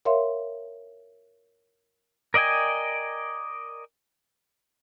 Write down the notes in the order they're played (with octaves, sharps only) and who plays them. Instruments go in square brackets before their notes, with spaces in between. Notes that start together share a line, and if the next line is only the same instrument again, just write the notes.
[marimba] A#4 C#5 E5 F5 C6
[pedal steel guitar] A#4 D5 D#5 G5 G#5